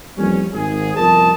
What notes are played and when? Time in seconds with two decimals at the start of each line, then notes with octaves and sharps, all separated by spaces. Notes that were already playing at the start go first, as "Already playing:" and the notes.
0.18 F2 E3 G3 A#3 C#4
0.54 G#1 G#4
0.97 G1 C2 F2 A#4 D#5 A5